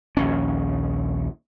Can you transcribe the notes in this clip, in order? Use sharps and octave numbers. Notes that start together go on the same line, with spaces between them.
A#1 D#2 C#4